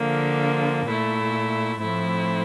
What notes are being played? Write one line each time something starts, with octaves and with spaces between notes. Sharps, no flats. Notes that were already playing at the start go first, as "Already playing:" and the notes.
Already playing: D3 F3 A#3
A#2 A3 E4
A2 F3 A3 C4 E4